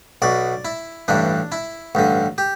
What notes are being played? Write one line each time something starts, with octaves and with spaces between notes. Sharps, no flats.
B1 B2 D5
E4
A1 G2 E3 D4
E4
A1 G2 D3
G4